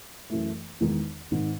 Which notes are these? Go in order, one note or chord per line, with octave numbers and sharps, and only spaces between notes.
F#2 E3 A3
E2 D#3 G#3 D#4
G#1 G#2 D#3